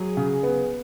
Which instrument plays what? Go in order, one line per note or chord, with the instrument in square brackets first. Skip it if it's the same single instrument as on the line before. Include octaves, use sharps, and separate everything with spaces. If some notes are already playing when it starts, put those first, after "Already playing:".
Already playing: [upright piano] F#3 [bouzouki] G#4
[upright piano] C#3
B3